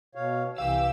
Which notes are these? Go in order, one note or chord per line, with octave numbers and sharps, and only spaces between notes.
B2 C#5 F5
C2 E3 G4 F5 E6